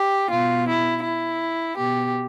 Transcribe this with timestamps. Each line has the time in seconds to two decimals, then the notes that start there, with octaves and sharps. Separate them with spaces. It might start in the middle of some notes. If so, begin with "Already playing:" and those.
Already playing: G4
0.30 B2 F4
0.68 E4
1.04 E4
1.77 B2 G4